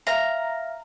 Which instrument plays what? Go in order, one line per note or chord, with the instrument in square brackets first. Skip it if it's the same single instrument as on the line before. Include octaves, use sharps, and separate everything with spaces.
[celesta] E5 F5 F6 [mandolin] A#5